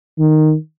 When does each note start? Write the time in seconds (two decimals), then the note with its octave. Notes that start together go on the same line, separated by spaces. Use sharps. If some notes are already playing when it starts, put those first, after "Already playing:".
0.19 D#3